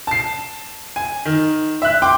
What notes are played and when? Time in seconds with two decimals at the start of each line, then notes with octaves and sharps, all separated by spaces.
0.07 A5 C7
0.96 G#5
1.25 D#3
1.82 E5 F#6
2.02 G5 C6 D6